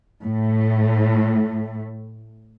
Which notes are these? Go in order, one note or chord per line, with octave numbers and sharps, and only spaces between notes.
A2 A3